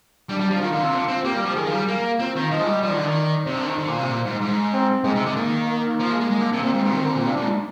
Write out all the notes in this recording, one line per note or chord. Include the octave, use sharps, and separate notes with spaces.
G3 D4
G3
F3
D#3 F4
D3
C3
D3
C4
A#3 G4
G3
F3
D#3 G#4
F3
G3
A#3
C4 F4
D#3
F3 D#5
G#3
G3
F3 D5
D#3
D3
D#3
C3 C5
D3
D#3
D3
A#2
C3
A#2
G#2
G#2
C4
G#2 G#3
C3
D3
D#3 A#3
A#3
F3
G#3
G#3
G#3
D3
C3
A#2 C4
G#2
G2
D#3
D3
A#2
C3 D4
A#2
G#2